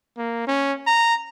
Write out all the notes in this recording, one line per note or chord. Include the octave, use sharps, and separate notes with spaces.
A#3
C#4
A#5